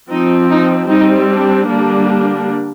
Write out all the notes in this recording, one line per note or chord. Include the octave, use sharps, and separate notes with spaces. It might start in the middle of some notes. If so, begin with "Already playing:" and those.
F3 C4 D#4
D#4
G3 C4 D#4
D4
D3 G3 A#3 D4